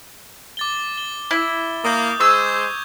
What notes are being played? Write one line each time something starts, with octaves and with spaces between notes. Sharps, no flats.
D6 A6 G7
G7
E4
A#3 D#6 G6
G#3 G#4 C5 C#6 E6 G#6